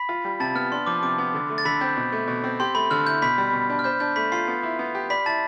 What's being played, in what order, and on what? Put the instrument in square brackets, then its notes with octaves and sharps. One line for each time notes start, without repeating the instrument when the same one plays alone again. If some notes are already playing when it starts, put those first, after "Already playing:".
Already playing: [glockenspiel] B5 B6
[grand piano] F4
G3
[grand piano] C3 [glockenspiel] A5 A6
[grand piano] B3 [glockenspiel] F6
[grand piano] D4 [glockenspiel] C6
[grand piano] F3 [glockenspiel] D6
[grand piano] C3 [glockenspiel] D6
[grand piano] B3
D3
A3
[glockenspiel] A6
[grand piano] D3 [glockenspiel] B5 B6
[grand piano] C4 [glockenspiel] G6
[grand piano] B2
A3
B2
C4
[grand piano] G4 [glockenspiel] C6
[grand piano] A3 [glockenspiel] B5
[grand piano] D3 [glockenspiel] F6
[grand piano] E4 [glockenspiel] G6
[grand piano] B2 [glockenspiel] B5 B6
[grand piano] G3
B2
D4
[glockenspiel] F6
[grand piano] C5 [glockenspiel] G6
[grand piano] D4 [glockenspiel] G6
[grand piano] A3 [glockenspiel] B5 B6
[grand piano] F4 [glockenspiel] C6 C7
[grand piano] B3
E4
B3
G4
[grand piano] D5 [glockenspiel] B5 B6
[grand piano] E4 [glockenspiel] A5 A6